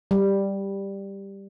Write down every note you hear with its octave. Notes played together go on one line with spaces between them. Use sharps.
G3